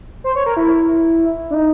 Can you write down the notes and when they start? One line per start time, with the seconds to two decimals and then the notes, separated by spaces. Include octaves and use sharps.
0.24 C5
0.35 C#5
0.46 A#4
0.57 E4
1.50 D4
1.54 D#4